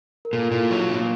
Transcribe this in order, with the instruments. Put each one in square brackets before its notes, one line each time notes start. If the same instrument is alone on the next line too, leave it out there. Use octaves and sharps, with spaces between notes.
[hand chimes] A#4
[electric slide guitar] A#2 [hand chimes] A4
[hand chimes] F4
[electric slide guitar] A#2 [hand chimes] E4
[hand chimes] F4
[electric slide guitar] F#3
A#2